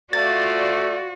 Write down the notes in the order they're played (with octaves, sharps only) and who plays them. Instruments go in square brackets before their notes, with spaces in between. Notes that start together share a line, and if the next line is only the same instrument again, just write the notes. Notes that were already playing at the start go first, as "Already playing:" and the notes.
[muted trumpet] A3 [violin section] F4 C5 D5 [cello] F#4 [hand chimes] A6